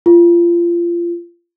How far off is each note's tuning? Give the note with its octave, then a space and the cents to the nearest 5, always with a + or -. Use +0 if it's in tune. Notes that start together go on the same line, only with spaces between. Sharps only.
F4 -25